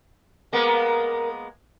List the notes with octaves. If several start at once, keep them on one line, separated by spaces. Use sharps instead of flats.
G#3 A#3 B3 A#4